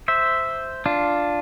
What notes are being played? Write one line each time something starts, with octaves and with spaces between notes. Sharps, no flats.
C5 E5
D4 F4